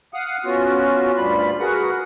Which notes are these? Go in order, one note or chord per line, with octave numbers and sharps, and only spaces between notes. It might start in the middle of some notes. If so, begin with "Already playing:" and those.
F5 F#5 D#6
B3 C#4 F4 F#4
D2 G2 G3 F4 B5
F#4 G#4 A#4 B4 F#5